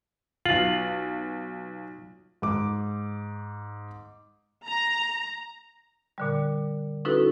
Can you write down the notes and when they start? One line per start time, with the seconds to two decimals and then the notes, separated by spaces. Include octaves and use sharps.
0.45 B1 F4 F#7
2.42 G#2 D6
4.66 A#5
6.18 A#2 D3 G3
7.05 C#4 D#4 E4 F#4 A4 B4